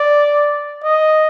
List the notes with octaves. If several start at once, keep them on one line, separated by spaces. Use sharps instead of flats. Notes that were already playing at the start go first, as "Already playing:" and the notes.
Already playing: D5
D#5